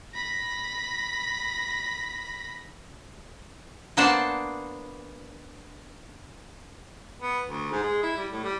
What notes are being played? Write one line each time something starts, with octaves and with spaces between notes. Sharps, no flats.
B5 A#6
A#3 B3 D4 C5 D5 A5
B3
D2
G#2
G#3
E4
G3
A2
G3